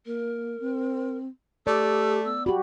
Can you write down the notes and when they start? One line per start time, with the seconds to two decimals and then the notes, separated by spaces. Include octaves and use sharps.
0.06 A#3 A#4
0.60 C4
1.67 A3 G4 D5 E6
2.25 B3 E6
2.46 F#4 G4 B5